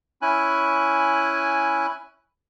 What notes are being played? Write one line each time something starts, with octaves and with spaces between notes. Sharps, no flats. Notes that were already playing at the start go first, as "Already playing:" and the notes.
C#4 E4 G#5 F#6